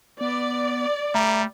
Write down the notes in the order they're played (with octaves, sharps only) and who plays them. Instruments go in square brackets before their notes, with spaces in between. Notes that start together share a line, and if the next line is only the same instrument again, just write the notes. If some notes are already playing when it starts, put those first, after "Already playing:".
[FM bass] B3 [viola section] D5
[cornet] G3 [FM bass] A3 [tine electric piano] E5 A#5